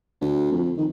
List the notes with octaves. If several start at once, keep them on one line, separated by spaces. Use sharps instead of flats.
D2
F2
D#3